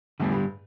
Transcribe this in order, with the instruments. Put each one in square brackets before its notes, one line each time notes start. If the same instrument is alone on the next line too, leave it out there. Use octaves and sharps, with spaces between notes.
[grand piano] E2 A2 [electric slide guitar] D3 G3 B3
[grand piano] G2